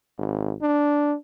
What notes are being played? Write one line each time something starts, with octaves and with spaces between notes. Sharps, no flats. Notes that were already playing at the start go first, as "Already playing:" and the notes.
G#1
D4